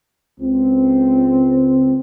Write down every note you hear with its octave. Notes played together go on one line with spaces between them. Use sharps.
C#2 C4